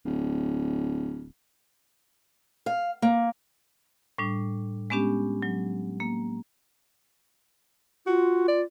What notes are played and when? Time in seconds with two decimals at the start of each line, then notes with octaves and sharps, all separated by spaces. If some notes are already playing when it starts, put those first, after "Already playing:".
0.05 D1
2.66 F5
3.02 A#3
4.18 A2 G3 D4
4.90 G#3 B3 C#4 D4 G4
5.42 F#3
6.00 A#3
8.07 F4 F#4
8.48 D5